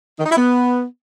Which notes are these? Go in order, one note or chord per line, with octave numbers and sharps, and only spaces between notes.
D#3
D#4
E4
B3